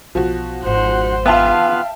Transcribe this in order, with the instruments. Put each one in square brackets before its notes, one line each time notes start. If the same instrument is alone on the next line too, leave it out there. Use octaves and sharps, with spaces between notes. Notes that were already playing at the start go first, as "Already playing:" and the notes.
[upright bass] B1 E3 [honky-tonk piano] F3 F#4
[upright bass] G#1 F2 [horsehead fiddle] C5 F#5
[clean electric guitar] B3 F4 [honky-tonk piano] E5 G5 A5 [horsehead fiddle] F5